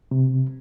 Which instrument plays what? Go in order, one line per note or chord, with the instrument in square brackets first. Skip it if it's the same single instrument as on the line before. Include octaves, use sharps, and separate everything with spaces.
[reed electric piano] C3